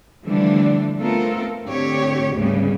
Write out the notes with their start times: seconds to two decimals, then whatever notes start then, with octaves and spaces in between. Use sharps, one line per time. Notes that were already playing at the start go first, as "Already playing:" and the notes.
0.24 D3 E3 F3 G3 A3 D4
0.99 A3 B3 C4 F4 A4 A#4
1.65 A2 D3 C4 G4 C#5
2.34 D2 G#2 C#3 G3 B3